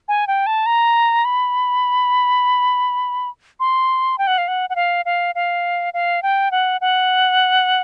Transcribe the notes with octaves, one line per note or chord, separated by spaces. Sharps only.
G#5
G5
A5
A#5
B5
C6
G5
F#5
F5
F#5
F#5
F5
F5
F5
F5
G5
F#5
F#5